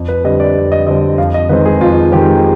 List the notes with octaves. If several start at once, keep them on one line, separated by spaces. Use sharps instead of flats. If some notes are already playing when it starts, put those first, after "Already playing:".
Already playing: F2
B4
D3 G3 C4 D#5
D5
F2
D#5
D3 G3 C4 D#5
F2 F5
D#5
D#3 G#3 C4 B4
G#4
F2 F4
D#3 G#3 C4 G4